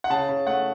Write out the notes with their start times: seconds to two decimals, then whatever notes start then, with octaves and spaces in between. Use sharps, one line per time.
0.04 F#5
0.10 C#3 A5
0.29 C#3
0.47 A3 F#5